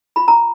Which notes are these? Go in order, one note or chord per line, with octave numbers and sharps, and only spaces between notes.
F4 B5
A#5